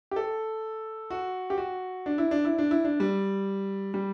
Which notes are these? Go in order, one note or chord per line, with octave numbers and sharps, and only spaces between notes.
G4
A4
F#4
G4
F#4
D4
E4
D4
E4
D4
E4
D4
G3
G3